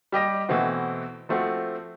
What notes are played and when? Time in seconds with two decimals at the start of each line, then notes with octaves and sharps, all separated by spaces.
0.12 G3 G4 D#5 A#6
0.49 B2 E3 A3 C4 F#4
1.29 F3 A3 C4 F#4